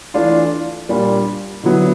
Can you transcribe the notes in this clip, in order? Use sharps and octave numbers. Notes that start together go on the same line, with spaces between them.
E3 A3 D4 F4
A#2 G3 A#3 D4 F4
D3 F#3 B3 E4